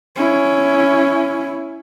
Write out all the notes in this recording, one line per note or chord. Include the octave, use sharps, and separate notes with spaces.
C#4 E4